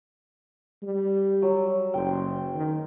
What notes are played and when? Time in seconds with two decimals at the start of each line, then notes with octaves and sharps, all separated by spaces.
0.83 G3
1.42 F#3 E6
1.94 F#1 C5 G5
2.55 D#3